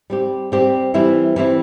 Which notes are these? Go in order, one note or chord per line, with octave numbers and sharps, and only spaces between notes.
G3 C4 G4
G3 C4 G4
E3 G3 C4 E4
E3 G3 C4 E4